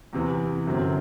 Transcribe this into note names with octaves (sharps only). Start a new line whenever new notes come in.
E2 C3 E3
G1 F#2 F#3 C4